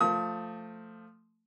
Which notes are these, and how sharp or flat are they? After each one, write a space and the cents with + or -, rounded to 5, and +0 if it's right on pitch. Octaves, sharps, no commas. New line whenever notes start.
F3 +0 A3 +15 D#6 +40